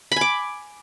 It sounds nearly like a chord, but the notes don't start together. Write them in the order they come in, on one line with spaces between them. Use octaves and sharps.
B5 G#5 D6